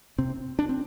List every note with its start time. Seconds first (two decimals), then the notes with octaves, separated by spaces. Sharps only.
0.18 C3 C4
0.59 D4
0.69 C4